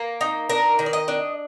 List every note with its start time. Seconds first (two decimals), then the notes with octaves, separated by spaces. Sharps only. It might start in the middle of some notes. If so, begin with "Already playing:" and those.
Already playing: A#3
0.21 D#4
0.49 D4 A#4
0.79 D#3
0.86 D5
0.93 D#5
1.08 D4